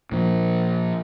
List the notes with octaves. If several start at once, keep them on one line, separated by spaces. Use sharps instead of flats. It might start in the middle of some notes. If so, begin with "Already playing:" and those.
A#2 F3